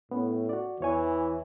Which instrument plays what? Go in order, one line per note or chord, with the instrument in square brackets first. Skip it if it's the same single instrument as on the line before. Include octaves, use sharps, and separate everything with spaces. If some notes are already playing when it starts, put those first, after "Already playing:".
[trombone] A2 [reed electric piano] B3 C#4
[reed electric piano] F#4 D5
[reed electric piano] E2 C#5 G#5 [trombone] E3